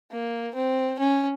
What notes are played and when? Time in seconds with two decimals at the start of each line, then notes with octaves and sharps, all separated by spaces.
0.11 A#3
0.55 C4
0.99 C#4